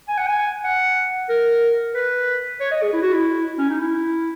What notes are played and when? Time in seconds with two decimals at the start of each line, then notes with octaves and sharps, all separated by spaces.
0.08 G#5
0.18 F#5
0.27 G#5
0.64 F#5
1.29 A#4
1.94 B4
2.60 C#5
2.71 D#5
2.82 G#4
2.93 E4
3.02 F#4
3.13 E4
3.58 C#4
3.70 D#4
3.80 E4